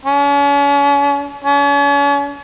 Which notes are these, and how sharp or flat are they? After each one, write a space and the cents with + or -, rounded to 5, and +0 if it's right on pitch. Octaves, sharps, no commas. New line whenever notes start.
C#4 +40
C#4 +40